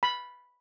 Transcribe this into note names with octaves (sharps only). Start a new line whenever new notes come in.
B5